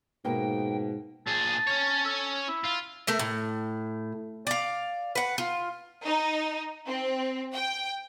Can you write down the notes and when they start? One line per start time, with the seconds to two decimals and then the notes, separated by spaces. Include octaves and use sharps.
0.25 G#2 B2 A#3 B3 G5
1.27 A#2 G#4 A5
1.67 C#4 C#5
2.05 A4
2.48 E4
2.64 F4
3.07 A3 A#4 E5
3.19 A2
4.47 D5 F5
5.15 B4 F#5
5.38 F4
6.04 D#4
6.86 C4
7.53 G5